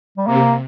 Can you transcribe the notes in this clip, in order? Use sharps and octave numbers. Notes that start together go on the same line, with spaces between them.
G3
C3 A#3